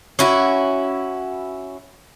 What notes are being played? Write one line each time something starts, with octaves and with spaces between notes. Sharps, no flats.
C#4 E4 F#4